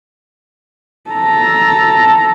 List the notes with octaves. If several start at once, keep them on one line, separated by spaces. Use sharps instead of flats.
A4 A#5